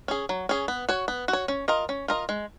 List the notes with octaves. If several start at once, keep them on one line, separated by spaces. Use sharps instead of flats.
C#4 G#4
F#3
C#4 G#4
B3
F#4 C#5
B3
F#4
C#5
C#4
F4 A#4 D#5
C#4
F4 A#4 D#5
G#3